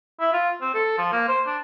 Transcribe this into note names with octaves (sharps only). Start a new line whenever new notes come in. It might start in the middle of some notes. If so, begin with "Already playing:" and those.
E4
F4
C4
A4
F3
A#3
C5
D4